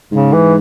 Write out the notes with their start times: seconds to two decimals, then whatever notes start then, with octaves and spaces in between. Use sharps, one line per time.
0.12 G#2 C#3
0.33 E3